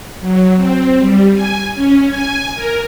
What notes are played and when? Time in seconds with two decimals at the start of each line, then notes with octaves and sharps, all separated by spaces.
0.20 F#3
0.56 C4
0.99 G3
1.33 G#5
1.74 C#4
2.08 G#5
2.55 A#4